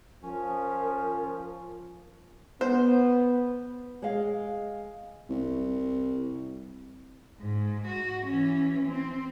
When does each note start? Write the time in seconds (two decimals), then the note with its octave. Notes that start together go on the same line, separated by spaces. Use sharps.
0.23 F3 C#4 A#4
2.61 B3 C5
4.02 G#3 G#4 D#5 F5
5.29 C2
7.41 G#2
7.87 F#4
8.26 E3 C#4
8.86 C4